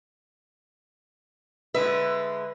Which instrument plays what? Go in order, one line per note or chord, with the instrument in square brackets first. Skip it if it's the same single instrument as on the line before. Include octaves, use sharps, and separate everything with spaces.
[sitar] D3 G#3 E5 [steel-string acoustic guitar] B4